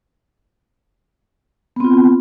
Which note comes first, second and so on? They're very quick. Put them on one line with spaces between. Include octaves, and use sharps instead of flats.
B3 C4 F4